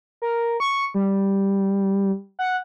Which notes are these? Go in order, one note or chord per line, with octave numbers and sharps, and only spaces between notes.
A#4
C#6
G3
F#5